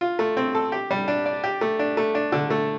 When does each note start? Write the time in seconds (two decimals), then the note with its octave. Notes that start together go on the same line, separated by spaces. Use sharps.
0.01 F4
0.19 A3
0.37 C4
0.55 A4
0.72 G4
0.91 G3
1.08 D4
1.26 D5
1.44 G4
1.61 A3
1.79 D4
1.97 A3
2.15 D4
2.32 D3
2.50 A3